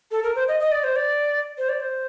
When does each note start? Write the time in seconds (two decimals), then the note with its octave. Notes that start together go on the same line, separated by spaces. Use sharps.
0.11 A4
0.23 A#4
0.35 C5
0.48 D#5
0.60 D#5
0.72 D5
0.84 C5
0.96 D5
1.58 C5
1.69 D5
1.80 C5